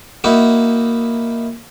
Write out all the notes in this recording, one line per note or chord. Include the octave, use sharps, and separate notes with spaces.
A#3 D#4 E4 F#4